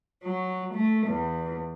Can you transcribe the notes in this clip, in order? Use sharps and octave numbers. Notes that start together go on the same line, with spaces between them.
F#3
A3
E2